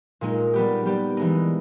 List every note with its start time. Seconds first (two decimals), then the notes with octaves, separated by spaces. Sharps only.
0.21 A#2 G#3 D#4
0.54 G3 B3 G4
0.85 G3 B3 G4
1.17 E3 G#3 D#4